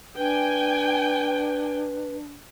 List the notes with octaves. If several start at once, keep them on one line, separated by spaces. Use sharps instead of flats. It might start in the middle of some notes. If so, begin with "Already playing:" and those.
D4 B4 G5 G#5